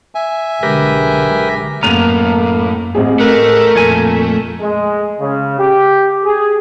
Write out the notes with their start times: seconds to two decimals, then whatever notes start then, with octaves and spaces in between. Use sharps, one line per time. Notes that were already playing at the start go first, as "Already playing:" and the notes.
0.15 E5 G#5
0.63 B1 D3 G#3 G4 A#4 B4
1.83 F#2 A2 A#3 B3 A#5 F6 D#7 F7
2.95 A1 C4 G#4
3.20 A3 A#4 B4
3.76 F2 A#2 G#5 G#6
4.59 G#3
5.20 C#3
5.59 G4
6.24 G#4